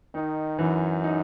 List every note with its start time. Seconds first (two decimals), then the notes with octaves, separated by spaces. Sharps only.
0.14 D#3 D#4
0.58 F#2 E3
1.04 D#4